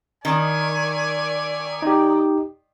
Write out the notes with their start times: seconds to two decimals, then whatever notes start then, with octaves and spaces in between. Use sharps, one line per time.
0.25 D#3 C#5 D5 E5 G#5
1.82 D#4 G4